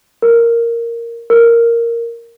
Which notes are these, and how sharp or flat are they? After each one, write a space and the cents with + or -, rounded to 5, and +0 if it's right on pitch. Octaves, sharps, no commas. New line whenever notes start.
A#4 -5
A#4 -5